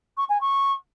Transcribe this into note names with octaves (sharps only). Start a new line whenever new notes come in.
C#6
G#5
C#6